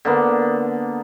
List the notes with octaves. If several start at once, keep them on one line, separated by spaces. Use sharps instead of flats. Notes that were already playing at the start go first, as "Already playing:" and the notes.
D3 A#3 B3